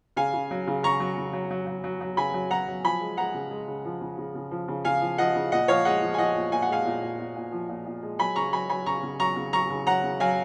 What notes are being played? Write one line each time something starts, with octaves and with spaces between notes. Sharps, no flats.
C#3 F5 G#5
C#3
F#3
C#3
C#3 A#5 C#6
F#3
C#3
F#3
F#3
F#3
F#3
F#3
C#3 G#5 B5
F#3
F#3 F#5 A#5
F#3
F3 G#5 B5
G#3
G#3 F#5 A#5
C#3
G#3
C#3
F3
C#3
C#3
C#3
F3
C#3
C#3 F5 G#5
F3
F3 D#5 F#5
C#3
A#2 D#5 F#5
F3 C#5 F5
G#3 D#5 F#5
F3
G#5
F3 D#5 F#5
A#2
A#2 G#5
F#5
G#3 F5 G#5
A#2
A#2
A#2
A#2
F3
A#2
A#2
G#3
F#3 G#5 B5
C#3 A#5 C#6
F#3 G#5 B5
F#3 G#5 B5
C#3 A#5 C#6
C#3
F#3 A#5 C#6
C#3
F#3 A#5 C#6
C#3
F#3 F#5 A#5
C#3
F#3 F5 G#5